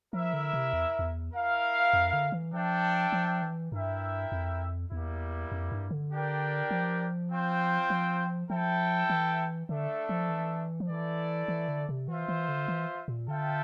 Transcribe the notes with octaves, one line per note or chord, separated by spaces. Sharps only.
F3 E4 A#4 E5
D3
C3
E2
E2
E4 A#4 F5
F2
D3
E3
F3 D4 A4 E5 G5
F3
E3
G2 E4 A#4 E5 G5
F2
E2 G3 A#3 E4
F2
G2
D3
D4 G4 A#4 D5 G5
F3
C4 F4 C5 G5
F3
F3 E4 A4 E5 G5
E3
D3 A3 D4 A4 E5
F3
E3
F3
E3 A3 E4 A4 D5
E3
D3
C3
E3 F4 C5 E5
E3
D3
E3
A#2
D3 F4 A4 E5 G5